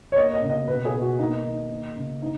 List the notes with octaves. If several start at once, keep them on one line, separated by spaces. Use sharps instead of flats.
C#5
A#3 D#5
D#5
C#3
D#5
B2 B4
G#4
B2
F#4
A#3 D#4
D#3
A#3
C#3
D#3 D#4